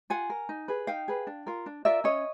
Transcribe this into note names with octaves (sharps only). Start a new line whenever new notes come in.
F4 F#5 G#5
A#4
D#4
G#4 B4
D#4 F5 G5
G#4 B4
D4
F4 A#4
D4
F4 A#4 D5 E5
C#4 C#5 D#5